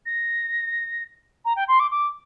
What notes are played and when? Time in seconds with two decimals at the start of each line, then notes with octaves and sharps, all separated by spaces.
0.06 A#6
1.45 A#5
1.56 G5
1.68 C6
1.80 D6
1.91 D6